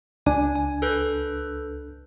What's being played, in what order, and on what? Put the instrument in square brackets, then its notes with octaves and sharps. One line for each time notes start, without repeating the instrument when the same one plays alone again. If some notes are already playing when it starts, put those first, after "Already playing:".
[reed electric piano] C#2 D4 [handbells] G#5
[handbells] G#5
A4 B4 G6